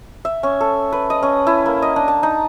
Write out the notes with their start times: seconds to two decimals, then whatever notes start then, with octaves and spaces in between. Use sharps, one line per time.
0.25 E5
0.43 C#4
0.61 A4
0.92 B4
1.10 D#5
1.23 C#4
1.47 E4
1.66 A#3
1.82 D#5
1.96 D4
2.08 A5
2.23 D#4